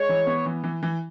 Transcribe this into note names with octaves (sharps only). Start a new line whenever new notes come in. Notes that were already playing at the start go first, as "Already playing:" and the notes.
Already playing: G#3 C#5
E3
B3
E3
E3
E3